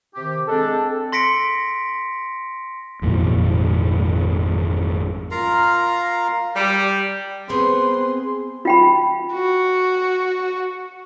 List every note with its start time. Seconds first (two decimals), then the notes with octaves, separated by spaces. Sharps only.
0.14 C3 D#3 G4
0.48 G#3 C4 D4 A4
1.12 C6 A#6 B6 C#7 D7
3.02 G#1 F2 A#2 E3
5.31 F4 A#4 F5 A#5
6.55 G3
7.49 B3 C4 G#4 B4 C6
8.65 F4 G5 B5
9.33 F#4